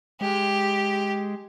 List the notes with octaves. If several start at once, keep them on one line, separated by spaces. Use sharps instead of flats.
G#3 G4